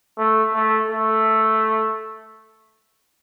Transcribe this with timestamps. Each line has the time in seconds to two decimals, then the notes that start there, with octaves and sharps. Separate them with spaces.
0.18 A3
0.54 A3
0.89 A3